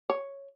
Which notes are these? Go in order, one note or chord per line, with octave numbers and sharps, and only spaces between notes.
C#5